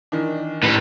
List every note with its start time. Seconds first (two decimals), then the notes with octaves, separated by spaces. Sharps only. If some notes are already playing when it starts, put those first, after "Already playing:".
0.12 D#3 E3 D4
0.63 A2 B4